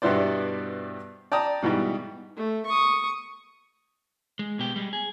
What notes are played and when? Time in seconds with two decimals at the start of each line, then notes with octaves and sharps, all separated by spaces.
0.02 G2 B2 B3 E4 C5 D5
1.32 D5 G5 A5 A#5 D#6
1.62 G#2 B2 E3 G3
2.36 A3
2.66 C#6 D#6
4.39 G#3
4.59 B2 G4
4.76 G3 G#3
4.93 G#4